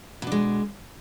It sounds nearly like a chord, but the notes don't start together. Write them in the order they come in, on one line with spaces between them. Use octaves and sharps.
B2 D4 G#3